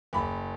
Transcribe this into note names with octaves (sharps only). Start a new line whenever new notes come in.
F#1 B5